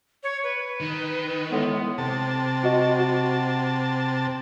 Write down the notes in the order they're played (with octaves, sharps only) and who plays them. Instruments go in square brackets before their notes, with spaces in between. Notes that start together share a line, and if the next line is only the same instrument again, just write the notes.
[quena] C#5
B4
[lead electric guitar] D#3
[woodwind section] A2 G#3 B3
[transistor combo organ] C3 A5
[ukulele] F#4 D#5
F#4 B5